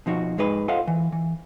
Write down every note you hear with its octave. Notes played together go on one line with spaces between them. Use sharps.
B2 F3 D#4 F#4
G#2 G#3 D#4 B4 B5
F4 A4 C5 D#5 F5 F#5
E3
E3